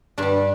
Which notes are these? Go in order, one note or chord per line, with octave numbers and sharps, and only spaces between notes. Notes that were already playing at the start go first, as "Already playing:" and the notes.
G2 G3 D4